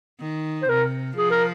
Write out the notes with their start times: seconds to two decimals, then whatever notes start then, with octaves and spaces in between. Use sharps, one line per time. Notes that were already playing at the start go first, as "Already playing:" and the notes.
0.20 D#3
0.62 C5
0.69 C3 A#4
1.17 F3 G#4
1.31 A#4